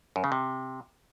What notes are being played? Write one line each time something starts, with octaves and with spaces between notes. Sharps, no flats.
F#2
C#3
C3